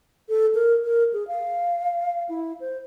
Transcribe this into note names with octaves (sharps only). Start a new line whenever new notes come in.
A4
A#4
A#4
G#4
F5
E4
C5